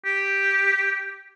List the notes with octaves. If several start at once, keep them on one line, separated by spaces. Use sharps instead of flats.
G4